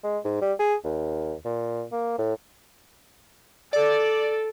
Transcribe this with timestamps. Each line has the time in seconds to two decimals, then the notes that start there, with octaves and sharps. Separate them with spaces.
0.04 G#3
0.25 G#2
0.42 G3
0.59 G#4
0.84 D#2
1.45 A#2
1.92 A#3
2.18 A2
3.73 A4 D5